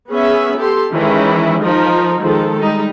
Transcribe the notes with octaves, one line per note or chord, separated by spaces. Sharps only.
B3 C#4 G#4 E5
G4 A4 C6
D#3 E3 G#3 C#4 E4
F3 D#4 A#4
D#3 F3 G#3 A4
G3 G#3 D#4